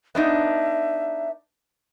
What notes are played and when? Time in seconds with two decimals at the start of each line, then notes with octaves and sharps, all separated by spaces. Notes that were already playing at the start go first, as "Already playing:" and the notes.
0.15 B3 D4 D#4 E5